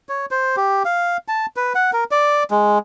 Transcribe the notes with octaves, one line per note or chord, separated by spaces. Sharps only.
C#5
C5
G4
F5
A5
B4
F#5
A#4
D5
G#3